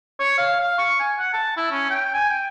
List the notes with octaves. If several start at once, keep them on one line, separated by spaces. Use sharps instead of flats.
C#5
F5
F5
C#6
G#5
F#5
A5
E4
C#4
G5
G#5
G5